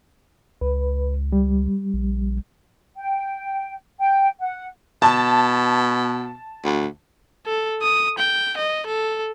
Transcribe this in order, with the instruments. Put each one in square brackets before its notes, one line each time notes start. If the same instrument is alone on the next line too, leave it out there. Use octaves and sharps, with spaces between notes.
[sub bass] C#2 [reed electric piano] B4
[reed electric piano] G3
[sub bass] A#1
[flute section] G5
G5
F#5
[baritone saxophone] B2 [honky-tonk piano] A5
[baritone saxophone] D2
[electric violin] A4
D#6
G5
D#5
A4